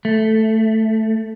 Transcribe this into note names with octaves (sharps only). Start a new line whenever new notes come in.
A3